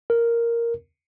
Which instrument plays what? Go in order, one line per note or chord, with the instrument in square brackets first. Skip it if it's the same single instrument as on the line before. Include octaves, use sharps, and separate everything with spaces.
[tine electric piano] A#4